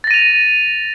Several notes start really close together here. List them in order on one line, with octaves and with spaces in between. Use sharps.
A6 A#6 D#7 F7